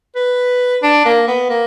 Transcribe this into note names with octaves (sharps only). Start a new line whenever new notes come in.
B4
D4
A#3
B3
A#3